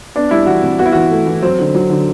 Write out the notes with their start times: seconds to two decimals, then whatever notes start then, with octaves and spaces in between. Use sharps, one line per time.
0.15 B3 D4
0.31 G3 E4
0.46 E3 F#4
0.63 C3
0.79 B3 F#4
0.86 E4
0.92 E3 F#4
1.11 A3
1.26 E3
1.42 F#3 C4
1.59 D3
1.74 F#3
1.90 D3